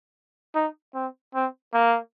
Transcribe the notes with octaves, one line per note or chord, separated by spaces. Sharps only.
D#4
C4
C4
A#3